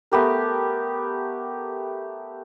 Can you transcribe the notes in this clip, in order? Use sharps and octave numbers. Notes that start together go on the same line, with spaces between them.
A3 B3 G4 A#4